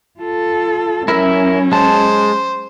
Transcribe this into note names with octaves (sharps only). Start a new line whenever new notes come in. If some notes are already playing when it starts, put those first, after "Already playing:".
F4 A4
F#3 C#4 E4 A#4 E5
G#3 C5 A5